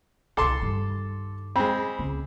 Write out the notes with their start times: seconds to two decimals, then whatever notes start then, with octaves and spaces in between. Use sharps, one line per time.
0.37 C2 B2 A4 A5 C6 D6
0.62 G2 D#3
1.56 G#3 C4 B5
1.99 C#2